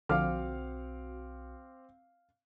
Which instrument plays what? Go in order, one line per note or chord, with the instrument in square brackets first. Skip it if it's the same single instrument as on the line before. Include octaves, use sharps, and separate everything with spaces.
[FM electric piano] B1 F#4 [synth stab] D3 F3 [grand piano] C4 D6 [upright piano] F5 F6